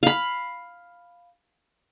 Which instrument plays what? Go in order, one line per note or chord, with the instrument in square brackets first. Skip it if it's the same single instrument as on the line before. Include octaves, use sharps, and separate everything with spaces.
[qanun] F5 B5